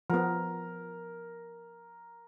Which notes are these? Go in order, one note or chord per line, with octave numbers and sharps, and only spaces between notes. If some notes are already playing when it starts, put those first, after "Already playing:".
F3 B3 A#4